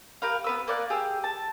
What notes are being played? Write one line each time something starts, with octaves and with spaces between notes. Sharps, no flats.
G4 A#4 B4 F5
B3 B4 E6
A#3 D5 F#5 F#6
G4 G#4 E6
A5